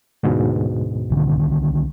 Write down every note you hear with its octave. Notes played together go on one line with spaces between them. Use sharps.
D2 G#2 B2
C2 D3 D#3